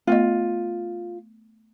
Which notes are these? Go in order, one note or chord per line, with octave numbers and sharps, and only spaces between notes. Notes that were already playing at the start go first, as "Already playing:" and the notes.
A3 B3 F4 D#5